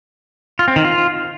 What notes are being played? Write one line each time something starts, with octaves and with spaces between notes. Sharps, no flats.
F4
C4
D#3
F4